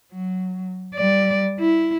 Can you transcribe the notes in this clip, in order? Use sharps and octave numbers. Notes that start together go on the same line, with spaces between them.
F#3
G3 D5
E4